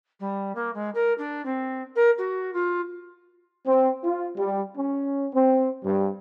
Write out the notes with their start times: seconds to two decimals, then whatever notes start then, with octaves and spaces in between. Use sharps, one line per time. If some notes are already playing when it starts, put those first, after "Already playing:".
0.19 G3
0.55 A#3
0.74 G#3
0.94 A#4
1.17 D4
1.45 C4
1.95 A#4
2.18 F#4
2.53 F4
3.67 C4
4.03 F4
4.36 G3
4.76 C#4
5.32 C4
5.84 G2